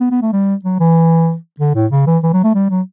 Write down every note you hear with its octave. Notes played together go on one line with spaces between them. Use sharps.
B3
B3
A3
G3
F#3
E3
D3
A2
C#3
E3
E3
F#3
A3
G3
F#3